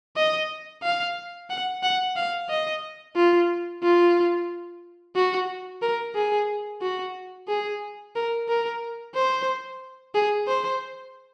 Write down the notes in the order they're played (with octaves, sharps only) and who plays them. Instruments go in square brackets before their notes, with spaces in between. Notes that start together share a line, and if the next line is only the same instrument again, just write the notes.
[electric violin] D#5
F5
F#5
F#5
F5
D#5
F4
F4
F#4
A#4
G#4
F#4
G#4
A#4
A#4
C5
G#4
C5